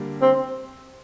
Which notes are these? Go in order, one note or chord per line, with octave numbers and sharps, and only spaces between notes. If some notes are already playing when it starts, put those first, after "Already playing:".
Already playing: D3 G3 A#3 D4
C4